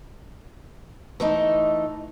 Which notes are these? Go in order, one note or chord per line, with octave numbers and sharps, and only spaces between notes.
E3 A3 D#4